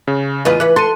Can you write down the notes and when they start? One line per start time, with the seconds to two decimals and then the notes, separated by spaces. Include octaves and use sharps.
0.07 C#3
0.45 E2 F4 B4 D#5
0.60 E3 B4 F#6
0.76 A4 C6 D#7